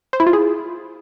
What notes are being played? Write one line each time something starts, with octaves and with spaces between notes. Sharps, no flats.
C5
E4
F4
G#4